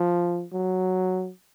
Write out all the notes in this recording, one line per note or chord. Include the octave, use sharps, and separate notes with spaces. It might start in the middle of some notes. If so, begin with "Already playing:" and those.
Already playing: F3
F#3